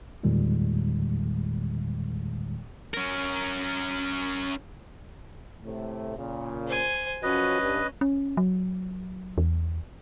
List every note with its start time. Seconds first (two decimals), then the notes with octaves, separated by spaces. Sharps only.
0.23 E2 A#2 D#3 G3 G#3
2.94 C#4 A#4
5.64 A2 C3 A3
6.18 A#2 C#3
6.67 C5 G#5
7.23 F#2 F3 C#4 F#4 B4 D#5
7.61 G2
8.01 C#4
8.37 F#3
9.38 E2